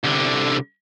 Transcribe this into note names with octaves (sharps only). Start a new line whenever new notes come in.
C2 D3